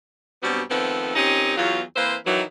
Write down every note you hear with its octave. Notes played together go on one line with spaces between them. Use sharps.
G2 B2 F#3 G3 B3 C4
D#3 F3 A3 B3 C4
A#2 C4 C#4 D#4 G4
E2 F#3 F4
E3 A#3 C4 B4 C5
D#3 E3 F#3